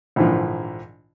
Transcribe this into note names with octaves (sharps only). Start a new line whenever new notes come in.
A#1 G#2 D3 E3 F3